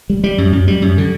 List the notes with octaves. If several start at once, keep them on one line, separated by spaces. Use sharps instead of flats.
G3
G3
F#2
F#2
G3
F#2
D3